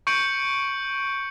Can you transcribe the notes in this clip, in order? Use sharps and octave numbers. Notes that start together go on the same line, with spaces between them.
C#6 G6 C#7 D7 F#7